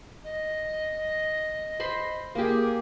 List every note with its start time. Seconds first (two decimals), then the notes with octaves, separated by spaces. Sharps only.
0.24 D#5
1.80 C5 B5 C6
2.35 A#3 G4 G#4